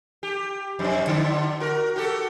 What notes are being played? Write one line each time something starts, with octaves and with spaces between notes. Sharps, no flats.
G4
F2 C3 D4
D3 D4 E4
F#4 A#4
F#4 G4 A4